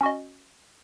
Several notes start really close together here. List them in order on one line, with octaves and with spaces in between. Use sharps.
C#4 F#4 D#5